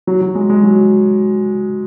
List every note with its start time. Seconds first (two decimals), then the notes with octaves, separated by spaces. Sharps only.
0.07 F#3
0.21 F#3
0.35 G#3
0.49 G#3
0.63 F#3